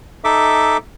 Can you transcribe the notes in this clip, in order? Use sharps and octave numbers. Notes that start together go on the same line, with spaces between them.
D#4 A4 E5 D6